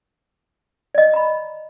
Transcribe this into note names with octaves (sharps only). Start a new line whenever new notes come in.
D5 D#5
A#5 B5